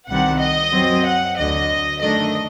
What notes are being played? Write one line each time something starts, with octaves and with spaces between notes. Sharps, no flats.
C2 C3 D#3 G3 C4 F#5
D#5
F#2 F#3 C4
F#5
D2 D3 F#3 D#5
F#2 D#3 A3 D4 D#5